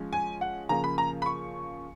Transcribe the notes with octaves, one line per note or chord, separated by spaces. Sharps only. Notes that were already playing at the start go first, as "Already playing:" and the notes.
Already playing: F3 G#3 C#4
G#5
F#5
C#3 F3 A#3 A#5
B5
A#5
B5
C#6